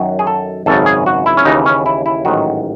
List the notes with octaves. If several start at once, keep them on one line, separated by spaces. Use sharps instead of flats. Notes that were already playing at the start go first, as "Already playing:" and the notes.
Already playing: F#2 D#3 F#3
G#4
A4
G#1 F#2 C#3 A4
G#4
F#4
E4
C#4
D#2 C#3 E3 D#4
C#4
E4
E4
A1 G#2 D#3 F#3 F#4